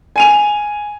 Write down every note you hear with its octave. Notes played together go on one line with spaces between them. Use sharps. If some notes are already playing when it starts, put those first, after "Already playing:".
G#5 D#7 F7